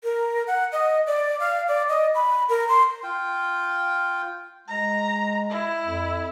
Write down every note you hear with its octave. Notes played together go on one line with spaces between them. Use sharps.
A#4
F#5
D#5
D5
F5
D5
D#5
B5
A#4
C6
F4 G5
G#3 A#5
E4
F2